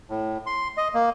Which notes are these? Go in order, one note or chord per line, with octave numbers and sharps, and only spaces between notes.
A2
C6
D#5
A#3